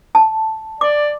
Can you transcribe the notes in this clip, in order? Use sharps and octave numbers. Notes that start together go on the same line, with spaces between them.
A5
D5 D6